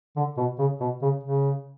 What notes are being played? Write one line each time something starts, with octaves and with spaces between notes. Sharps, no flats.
D3
B2
C#3
B2
C#3
C#3